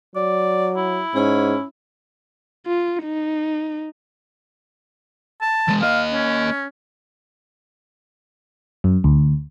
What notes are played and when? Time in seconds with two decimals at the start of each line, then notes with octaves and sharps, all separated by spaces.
0.16 F#3 D5
0.76 E4
1.15 G#2 C#4
2.67 F4
3.04 D#4
5.41 A5
5.68 E3 G#3
5.82 A#3 D#5 F5
6.12 C#4
8.84 F#2
9.04 D2